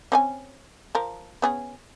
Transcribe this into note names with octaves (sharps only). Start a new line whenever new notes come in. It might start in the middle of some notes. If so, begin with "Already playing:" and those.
C4 C#4 G#5
F3 A#4
B3 C#4 G#4